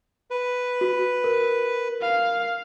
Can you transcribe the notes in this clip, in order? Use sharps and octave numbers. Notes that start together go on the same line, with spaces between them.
B4
F#4
A#4
F5